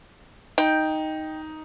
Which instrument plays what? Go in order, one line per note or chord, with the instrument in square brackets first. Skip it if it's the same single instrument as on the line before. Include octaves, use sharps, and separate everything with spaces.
[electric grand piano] D#4 [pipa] G5